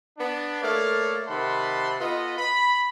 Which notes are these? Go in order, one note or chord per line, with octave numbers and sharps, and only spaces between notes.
B3 D4
A3 A#3 A4 C#5 D5 F5
C3 D#3 F#5 A5 B5 C6
B3 F4 A4 D#5
B5